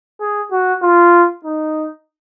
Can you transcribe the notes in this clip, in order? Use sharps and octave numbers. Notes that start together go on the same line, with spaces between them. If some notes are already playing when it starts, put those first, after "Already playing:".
G#4
F#4
F4
D#4